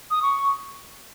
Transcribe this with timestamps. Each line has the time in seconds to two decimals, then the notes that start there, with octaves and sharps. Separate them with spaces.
0.11 D#6
0.22 C#6